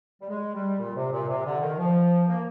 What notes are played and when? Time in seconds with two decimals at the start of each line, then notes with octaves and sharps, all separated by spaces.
0.21 G3
0.29 G#3
0.54 G3
0.79 A#2
0.96 C3
1.12 A#2
1.28 C3
1.45 D3
1.61 D#3
1.78 F3
2.27 A#3